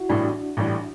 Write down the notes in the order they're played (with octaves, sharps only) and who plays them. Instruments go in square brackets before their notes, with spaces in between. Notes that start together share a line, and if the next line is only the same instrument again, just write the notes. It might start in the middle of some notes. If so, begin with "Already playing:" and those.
Already playing: [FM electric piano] E4 F#4
[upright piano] A1 A2 E3 G3 [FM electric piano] D4
[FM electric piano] D4
[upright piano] A1 A2 E3 G3